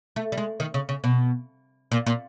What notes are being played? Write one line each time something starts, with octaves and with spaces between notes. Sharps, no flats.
A3
G3
G#3
D#3
C#3
C#3
B2
A#2
A#2